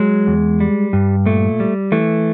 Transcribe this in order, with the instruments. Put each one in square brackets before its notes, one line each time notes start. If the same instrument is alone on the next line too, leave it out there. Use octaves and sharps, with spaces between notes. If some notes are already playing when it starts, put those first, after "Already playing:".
Already playing: [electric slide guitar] F#3 G#3
E2
G3
G2
A#2 A3
G3
E3 A3